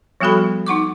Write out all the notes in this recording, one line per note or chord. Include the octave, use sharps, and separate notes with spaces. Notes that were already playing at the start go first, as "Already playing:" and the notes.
F3 G3 B3 F#4 A4 B5
D#4 F#5 C#6 D6